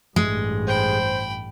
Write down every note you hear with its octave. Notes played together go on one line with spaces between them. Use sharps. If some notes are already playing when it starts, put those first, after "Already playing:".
A1 G2 G#3
C5 G5 B5